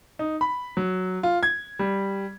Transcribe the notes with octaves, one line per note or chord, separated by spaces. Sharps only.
D#4
B5
F#3
F4
G#6
G3